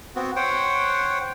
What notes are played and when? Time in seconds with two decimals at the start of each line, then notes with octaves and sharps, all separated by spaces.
0.16 B3 C4 F#4
0.36 C5 C#5 F#5 G5